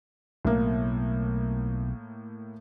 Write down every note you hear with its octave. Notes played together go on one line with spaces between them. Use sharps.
B1 A2 A#3